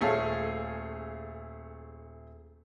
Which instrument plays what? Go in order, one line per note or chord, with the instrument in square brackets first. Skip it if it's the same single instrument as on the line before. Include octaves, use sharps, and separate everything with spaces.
[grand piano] D#1 A3 G#4 A4 C#5 F5